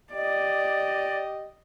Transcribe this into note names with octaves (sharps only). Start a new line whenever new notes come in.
G4 D5 D#5